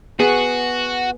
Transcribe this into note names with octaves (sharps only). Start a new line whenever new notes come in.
B3 F#4 G#4